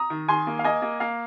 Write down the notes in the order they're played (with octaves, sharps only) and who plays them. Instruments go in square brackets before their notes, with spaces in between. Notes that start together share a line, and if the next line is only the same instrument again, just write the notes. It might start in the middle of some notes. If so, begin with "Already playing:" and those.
Already playing: [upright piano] A#5 D#6
D#3
D#3 G#5 C6
A#3
F5
A#3 D#5 G#5
A#3
A#3 F5